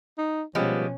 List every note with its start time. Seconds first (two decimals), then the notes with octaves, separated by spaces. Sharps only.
0.18 D#4
0.55 B2 F3 G3 G#3 B3 C#4